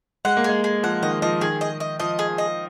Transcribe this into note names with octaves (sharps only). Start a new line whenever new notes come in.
G#3 F#5
A#3
G#3 G#4
G#4
F3 F#5
D#3 D#5
F3 D#5
D#3 G#4
D#5
D#5
F3 D#5
G#4
D#5